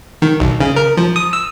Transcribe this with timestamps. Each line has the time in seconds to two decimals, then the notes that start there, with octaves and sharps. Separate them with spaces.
0.22 D#3
0.40 B1
0.60 C#3
0.76 A#4
0.97 F3
1.16 D#6
1.33 E6